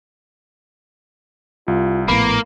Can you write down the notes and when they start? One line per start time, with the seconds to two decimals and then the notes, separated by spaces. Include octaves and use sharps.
1.68 C2 F4
2.08 A#1 A2 A#3 B3 B5